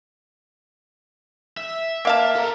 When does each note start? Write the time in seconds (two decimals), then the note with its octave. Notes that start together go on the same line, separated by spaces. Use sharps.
1.57 E5
2.05 A#3 F5 A5
2.36 A4 A#4